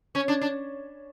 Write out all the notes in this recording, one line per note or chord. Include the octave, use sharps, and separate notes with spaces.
C#4
D4
D4